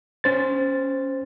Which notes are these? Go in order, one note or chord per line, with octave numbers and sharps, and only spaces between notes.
C#4 C5 A6